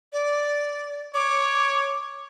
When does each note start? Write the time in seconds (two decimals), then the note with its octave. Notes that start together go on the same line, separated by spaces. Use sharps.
0.13 D5
1.14 C#5 D6